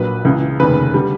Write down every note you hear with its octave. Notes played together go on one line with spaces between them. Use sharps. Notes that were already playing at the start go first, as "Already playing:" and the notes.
Already playing: A#1 A#2 F#3 B4
C#2 C#3 E3
F1 D#2 C#3 B4
D3 G3